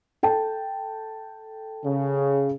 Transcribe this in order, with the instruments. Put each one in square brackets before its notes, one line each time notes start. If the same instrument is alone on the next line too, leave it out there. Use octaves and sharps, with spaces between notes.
[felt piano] A4 G5 A5
[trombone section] C#3